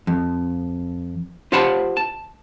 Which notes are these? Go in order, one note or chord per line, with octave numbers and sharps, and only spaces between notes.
F2
F4 G4 C5 F#5 A5 B5
A5